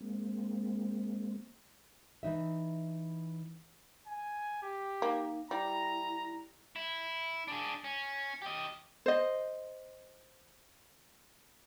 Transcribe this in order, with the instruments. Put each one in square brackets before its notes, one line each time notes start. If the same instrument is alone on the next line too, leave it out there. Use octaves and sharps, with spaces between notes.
[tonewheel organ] G#3 A#3 C4
[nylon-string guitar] E3 D#4 E5
[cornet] G#5
G4
[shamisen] A#3 [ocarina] D#4
[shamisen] G3 [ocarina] E4 [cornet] A#5
[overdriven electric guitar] E4
D4 G#4
C#4
G4 D#5
[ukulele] C5 D#5